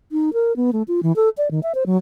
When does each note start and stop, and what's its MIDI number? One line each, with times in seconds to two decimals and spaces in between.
0.12 0.30 63
0.33 0.55 70
0.56 0.71 59
0.73 0.83 57
0.88 1.00 65
1.03 1.15 52
1.16 1.29 69
1.38 1.48 74
1.51 1.60 51
1.63 1.73 76
1.75 1.84 72
1.86 1.97 54